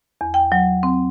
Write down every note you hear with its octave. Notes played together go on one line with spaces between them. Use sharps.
E2
G5
F#3
C4